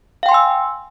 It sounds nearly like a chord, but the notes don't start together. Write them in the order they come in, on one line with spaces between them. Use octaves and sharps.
F5 G5 C6 G#5 E6